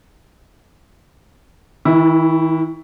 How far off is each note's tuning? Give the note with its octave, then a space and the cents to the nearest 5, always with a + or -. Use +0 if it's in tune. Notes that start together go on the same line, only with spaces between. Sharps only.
D#3 +45 E4 +0